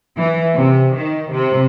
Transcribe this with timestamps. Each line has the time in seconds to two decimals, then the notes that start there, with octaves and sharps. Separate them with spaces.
0.17 E3
0.55 C3
0.97 D#3
1.32 C3